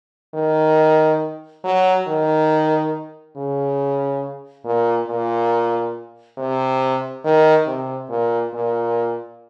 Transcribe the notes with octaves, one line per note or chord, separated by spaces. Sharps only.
D#3
F#3
D#3
C#3
A#2
A#2
C3
D#3
C3
A#2
A#2